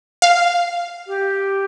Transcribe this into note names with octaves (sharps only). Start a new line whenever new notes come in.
F5
G4